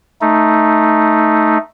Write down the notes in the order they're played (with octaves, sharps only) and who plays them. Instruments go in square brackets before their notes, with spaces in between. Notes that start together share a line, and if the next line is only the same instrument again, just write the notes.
[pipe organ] A3 D#4